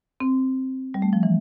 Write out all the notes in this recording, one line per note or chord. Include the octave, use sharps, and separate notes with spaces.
C4
G3
A3
F3
E3